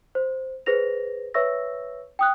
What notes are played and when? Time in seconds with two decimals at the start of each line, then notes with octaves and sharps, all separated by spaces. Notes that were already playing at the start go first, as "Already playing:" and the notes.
0.15 C5
0.66 G#4 B4 C5 A#6 F7
1.34 B4 C#5 E5 C#6 E6 A#6
2.19 G5 D#6 F#6